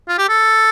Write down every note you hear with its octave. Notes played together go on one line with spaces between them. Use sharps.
F4
G4
A4